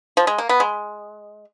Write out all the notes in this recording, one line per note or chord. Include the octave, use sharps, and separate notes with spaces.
F3
G#3
A#3
B3
G#3